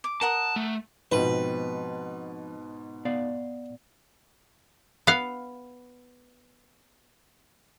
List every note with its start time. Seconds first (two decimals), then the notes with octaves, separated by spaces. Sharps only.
0.04 D6
0.21 A#4 F#5 A5 D#6
0.56 A3
1.12 G#2 B2 F3 B3 C4 B4
3.05 B3 D5 F5
5.07 B3 F5